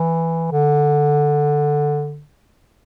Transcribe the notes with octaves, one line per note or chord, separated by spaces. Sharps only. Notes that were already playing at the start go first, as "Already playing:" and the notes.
Already playing: E3
D3